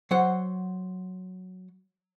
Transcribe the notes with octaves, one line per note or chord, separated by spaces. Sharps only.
F#3 C5 F#5